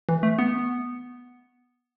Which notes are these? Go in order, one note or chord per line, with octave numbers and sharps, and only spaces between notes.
E3
A3
B3